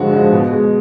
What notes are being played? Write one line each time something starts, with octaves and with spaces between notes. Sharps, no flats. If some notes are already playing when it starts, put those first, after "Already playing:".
Already playing: G2 D3 F3 G#3 F#4
D3 F3 G#3
B2
G#3